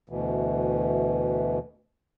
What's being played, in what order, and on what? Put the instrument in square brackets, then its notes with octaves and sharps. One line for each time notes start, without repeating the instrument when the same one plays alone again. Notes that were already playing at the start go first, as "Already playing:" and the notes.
[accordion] D2 B2 E3